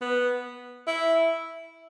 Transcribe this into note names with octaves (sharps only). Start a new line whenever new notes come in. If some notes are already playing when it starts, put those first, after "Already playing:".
B3
E4